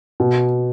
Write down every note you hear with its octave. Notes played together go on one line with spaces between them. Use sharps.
B2